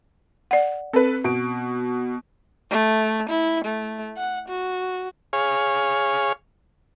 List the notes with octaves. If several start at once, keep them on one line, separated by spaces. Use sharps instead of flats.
D5 F#5
C4 A4 B4
B2 D7
A3
E4
A3
F#5
F#4
G#4 C#5 F5